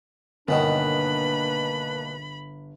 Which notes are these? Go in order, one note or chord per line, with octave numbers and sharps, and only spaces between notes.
G1 F#2 B2 D#3 A#3 D4 B4 B5